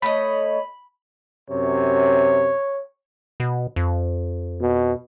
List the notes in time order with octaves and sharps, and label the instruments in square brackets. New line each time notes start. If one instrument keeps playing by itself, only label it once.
[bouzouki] A3 D#5 [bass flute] C#5 [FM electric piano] B5
[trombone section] F#2 C3 [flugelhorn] C#5
[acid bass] B2
F2
[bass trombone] B2